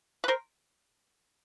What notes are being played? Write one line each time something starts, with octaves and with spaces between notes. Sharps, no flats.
B4
A#4 C5